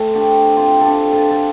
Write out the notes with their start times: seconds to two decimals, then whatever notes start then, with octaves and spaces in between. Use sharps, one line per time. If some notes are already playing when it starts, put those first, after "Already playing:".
Already playing: A3 C4
0.15 D4 G4
0.57 C4 F4
0.81 D4 G4 A4
1.13 F4 A4
1.31 A4